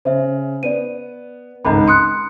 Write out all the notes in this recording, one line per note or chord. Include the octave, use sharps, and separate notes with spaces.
C#3 C5 E5
B3 D5 D#7
G#1 C#2 G#2 A#5 B5
C6 D#6 F#6 C#7